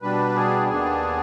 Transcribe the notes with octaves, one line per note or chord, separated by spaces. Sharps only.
B2 G3 D4 B4
G#4
D#2 D#3 B3 D4 G#4